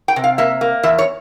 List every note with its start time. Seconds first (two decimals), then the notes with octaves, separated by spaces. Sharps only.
0.08 G5
0.16 C3
0.24 F5
0.38 A#3 E5
0.61 A#3
0.83 E2 E5
0.99 C#5